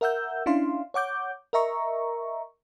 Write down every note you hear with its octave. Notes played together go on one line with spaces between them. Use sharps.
A#4 E5 F#5 E6 G6
C#4 D4 E4 F5 C6
C#5 F#5 D6 G6
A#4 D#5 E5 A#5 C#6